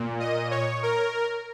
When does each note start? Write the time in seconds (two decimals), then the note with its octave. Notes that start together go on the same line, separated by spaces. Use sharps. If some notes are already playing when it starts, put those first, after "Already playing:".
Already playing: A#2
0.20 D#5
0.51 C#5
0.83 A#4